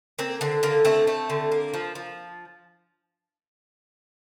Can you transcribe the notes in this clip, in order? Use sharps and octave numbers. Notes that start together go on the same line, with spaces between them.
A#3 C4
D3 C4
D3 A#3
A3 C4
A3
D3
A#3
F3
F3